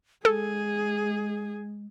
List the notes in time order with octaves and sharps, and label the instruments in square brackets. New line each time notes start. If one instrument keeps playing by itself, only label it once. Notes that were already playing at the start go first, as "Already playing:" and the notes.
[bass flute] G#3 [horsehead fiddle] G#4 [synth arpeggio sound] A4